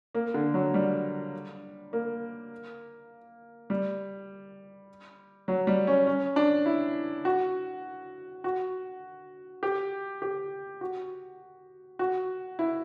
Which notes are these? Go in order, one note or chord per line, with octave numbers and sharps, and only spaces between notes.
A#3
D3
F#3
G3
A#3
G3
F#3
G3
C#4
C#4
D4
E4
F#4
F#4
G4
G4
F#4
F#4
E4